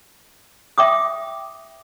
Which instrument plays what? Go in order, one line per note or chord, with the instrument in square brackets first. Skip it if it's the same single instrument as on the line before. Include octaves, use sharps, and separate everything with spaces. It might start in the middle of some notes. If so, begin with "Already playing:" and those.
[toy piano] E5 G5 D6 D#6